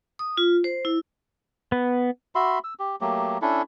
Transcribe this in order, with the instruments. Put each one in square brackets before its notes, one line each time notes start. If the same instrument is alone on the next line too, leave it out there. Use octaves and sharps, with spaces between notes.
[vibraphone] D#6
F4
C5
E4
[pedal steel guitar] B3
[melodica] F#4 E5 B5 C6
E6
G4
F#3 A3 A#3 G4
C#4 D4 E4 A4